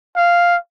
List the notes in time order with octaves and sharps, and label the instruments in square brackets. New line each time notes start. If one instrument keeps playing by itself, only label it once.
[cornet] F5